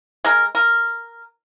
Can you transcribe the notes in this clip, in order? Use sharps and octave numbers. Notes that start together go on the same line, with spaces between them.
G#3 A#4
A#4